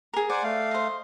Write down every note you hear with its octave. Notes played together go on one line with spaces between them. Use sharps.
G#4 A#4
C5 D5 F#5 G#5
A3 F5
C5 D#5